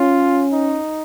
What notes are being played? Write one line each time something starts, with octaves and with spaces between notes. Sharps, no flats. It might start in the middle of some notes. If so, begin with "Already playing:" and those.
Already playing: C#4 F4
D#4